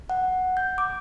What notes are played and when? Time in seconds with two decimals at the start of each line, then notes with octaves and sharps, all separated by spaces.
0.10 F#5
0.57 G6
0.78 D6